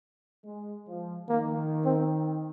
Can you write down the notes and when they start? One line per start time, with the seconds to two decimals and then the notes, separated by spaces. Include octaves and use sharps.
0.45 G#3
0.88 F3
1.29 D#3 A#3
1.85 C4